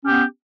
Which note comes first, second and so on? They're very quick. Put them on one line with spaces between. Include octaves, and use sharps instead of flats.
C#4 G4 B3